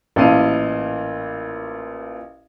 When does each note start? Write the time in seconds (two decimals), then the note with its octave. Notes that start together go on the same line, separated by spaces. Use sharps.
0.16 A1 A#2 E4 F5 A5 D#7